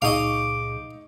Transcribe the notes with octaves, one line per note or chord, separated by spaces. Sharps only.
C#2 A#2 D#4 G#4 D#5 F5 C#6 D6